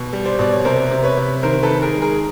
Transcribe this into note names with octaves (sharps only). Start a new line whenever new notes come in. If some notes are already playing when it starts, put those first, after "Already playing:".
Already playing: B2
G3
C5 D5
B2 D5
C#5
C3 A#4 C5
C3
B4 C#5
C3
D#3 A#4 C5
A4 B4
D#3
G#4 A#4
G#3
G#4 A#4